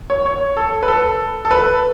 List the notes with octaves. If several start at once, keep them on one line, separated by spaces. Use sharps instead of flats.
C#5
C#5
A4
B4
A4
A4
B4